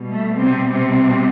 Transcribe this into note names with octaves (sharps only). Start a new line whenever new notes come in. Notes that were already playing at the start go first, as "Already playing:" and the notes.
Already playing: B2 G3
A3
C3 C4
C3 C4